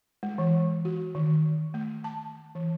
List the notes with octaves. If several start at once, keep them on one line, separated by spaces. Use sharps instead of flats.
G#3
E3
F#4
D#3
A3
A5
E3